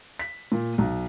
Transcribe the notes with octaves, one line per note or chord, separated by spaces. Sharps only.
B6
A#2
B1